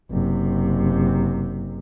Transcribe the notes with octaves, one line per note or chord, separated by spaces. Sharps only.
F#1 C3